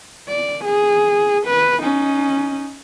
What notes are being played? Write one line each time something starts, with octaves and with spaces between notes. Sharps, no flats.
D5
G#4
B4
C#4 D#4